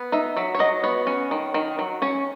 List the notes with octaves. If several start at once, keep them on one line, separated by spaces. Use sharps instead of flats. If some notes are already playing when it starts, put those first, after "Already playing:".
Already playing: B3
D#4 E5
F#3 E5
C#5
F#3 D#5
B3 C#5
C#4
D#3
D#3
F#3
C#4 C#5